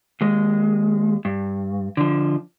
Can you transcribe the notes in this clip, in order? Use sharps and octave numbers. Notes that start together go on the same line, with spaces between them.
D#2 G#3
G2
D3 F3